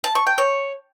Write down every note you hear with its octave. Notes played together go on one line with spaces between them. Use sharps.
A5
C#6
G5
C#5